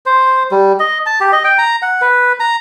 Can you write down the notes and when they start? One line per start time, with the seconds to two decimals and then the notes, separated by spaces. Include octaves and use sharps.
0.06 C5
0.51 G3
0.80 D#5
1.06 A5
1.20 G4
1.32 D#5
1.44 G5
1.58 A#5
1.82 F#5
2.02 B4
2.40 A#5